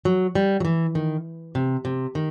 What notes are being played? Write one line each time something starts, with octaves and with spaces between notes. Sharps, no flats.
F#3
G3
F#3
E3
D#3
C3
C3
D#3